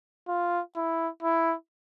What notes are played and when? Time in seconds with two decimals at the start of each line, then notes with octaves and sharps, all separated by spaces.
0.28 F4
0.76 E4
1.22 E4